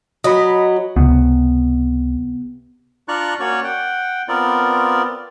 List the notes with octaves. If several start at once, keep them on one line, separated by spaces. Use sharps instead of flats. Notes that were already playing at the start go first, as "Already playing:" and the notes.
F#3 D#5 B5
C#2 C3 B3
D4 F4 D5 A#5 C#6 F#6
A#3 C#4 F#4 C#5 D5 C#6
F#5 G5
B3 C4 F4 A#4 D5